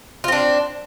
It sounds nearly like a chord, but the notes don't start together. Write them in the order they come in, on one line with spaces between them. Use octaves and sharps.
F4 C4 D4